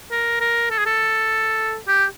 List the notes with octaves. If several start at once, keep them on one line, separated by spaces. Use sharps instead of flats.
A#4
A#4
A4
G#4
A4
G4